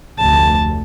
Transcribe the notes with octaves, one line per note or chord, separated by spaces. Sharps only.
F1 D2 A5